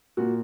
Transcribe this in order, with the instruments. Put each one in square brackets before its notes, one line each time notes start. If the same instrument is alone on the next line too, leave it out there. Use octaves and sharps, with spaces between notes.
[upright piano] A#2 F#4